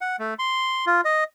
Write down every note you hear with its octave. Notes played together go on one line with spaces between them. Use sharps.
F#5
A3
C6
F4
D#5